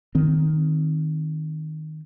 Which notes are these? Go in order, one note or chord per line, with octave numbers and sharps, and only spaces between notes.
D#3 C4